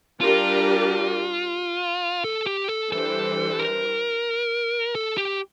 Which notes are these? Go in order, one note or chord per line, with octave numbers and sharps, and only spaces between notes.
G3 D4 F4 G4 A#4 D5
A4
G4
A4
E3 G3 D4 G4 A4 C5
A#4
A4
G4